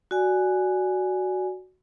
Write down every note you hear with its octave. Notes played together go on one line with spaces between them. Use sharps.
F#4 D5 G#5